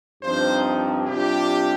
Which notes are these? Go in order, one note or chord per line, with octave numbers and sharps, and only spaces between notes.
G2 F3 C4 D#4 C5
C3 G3 D4 F4 G4